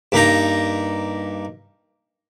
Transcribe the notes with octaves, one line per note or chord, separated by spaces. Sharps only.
G2 A#3 D#4 A#5